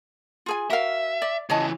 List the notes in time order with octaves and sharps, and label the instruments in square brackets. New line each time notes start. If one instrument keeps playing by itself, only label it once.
[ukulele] F4 G#4 G#5
[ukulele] F#4 A#4 F5 [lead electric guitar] E5
[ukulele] D5
[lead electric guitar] C#3 E3 [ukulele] C#5 D#5 A5